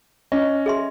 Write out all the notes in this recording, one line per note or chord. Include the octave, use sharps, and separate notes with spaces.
C#4 D#5
G#4 E5 C6